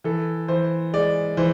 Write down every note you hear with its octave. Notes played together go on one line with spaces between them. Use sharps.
E3 A4
E3 C5
G#3 D5
E3 C5